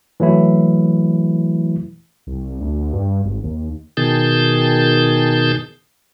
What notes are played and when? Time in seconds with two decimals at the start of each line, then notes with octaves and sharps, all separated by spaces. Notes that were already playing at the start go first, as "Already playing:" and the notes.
0.20 E3 F#3 A3 E4
2.27 C2
2.61 D2
2.93 G2
3.25 G#1
3.44 D#2
3.97 B2 D#3 G#4 A5 G6